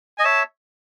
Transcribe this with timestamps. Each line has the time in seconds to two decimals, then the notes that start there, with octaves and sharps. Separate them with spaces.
0.18 D#5 G#5
0.25 C#5 E5 A5